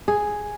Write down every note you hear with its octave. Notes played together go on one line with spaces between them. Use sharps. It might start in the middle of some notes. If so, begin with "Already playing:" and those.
G#4